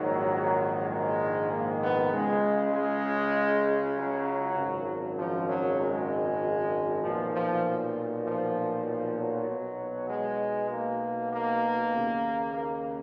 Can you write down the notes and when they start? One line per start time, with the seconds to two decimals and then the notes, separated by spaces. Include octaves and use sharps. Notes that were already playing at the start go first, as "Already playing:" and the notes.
Already playing: A#1 G#2 D#3 F#3
0.90 G#3
1.50 A#3
1.82 B3
2.11 C#2 C#3 G#3
2.73 G#3
3.96 F#3
4.57 G#1 F#2 C#3
5.18 F3
5.49 F#3
5.79 G#3
7.02 B1 A#2 F3
7.32 F3
8.24 F3
8.86 F3
9.17 F#3
9.47 B1 B2
10.09 G#3
10.70 A#3
11.31 A#3
11.93 D#2 C#3
12.54 A#3